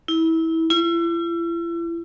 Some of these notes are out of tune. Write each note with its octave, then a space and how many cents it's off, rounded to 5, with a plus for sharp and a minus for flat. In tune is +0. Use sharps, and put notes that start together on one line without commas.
E4 -25
E4 +40